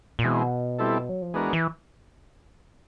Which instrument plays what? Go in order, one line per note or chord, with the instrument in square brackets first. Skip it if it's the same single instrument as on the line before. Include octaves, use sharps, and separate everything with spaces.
[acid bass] A#2
[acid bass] B2 [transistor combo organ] E3 G#3 C4
[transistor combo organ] G3 C4 E4 A4
[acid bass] F#3
F3
[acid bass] E3 [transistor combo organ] G#3 B3 D4 F#4 A#4
[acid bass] E3